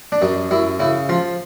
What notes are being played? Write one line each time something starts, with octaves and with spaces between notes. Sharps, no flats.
D4
F#2 D#4
F#2 E4
C#3 E4
F3 F4